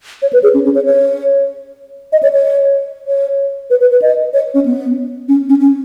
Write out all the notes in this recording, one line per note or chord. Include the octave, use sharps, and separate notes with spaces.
C#5
B4
G#4
C#4
C#4
C#5
C#5
D#5
C#5
C#5
C#5
B4
B4
B4
D#5
C#5
C#4
B3
C#4
C#4
C#4